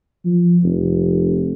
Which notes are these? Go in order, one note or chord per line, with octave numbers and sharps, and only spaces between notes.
F3
F1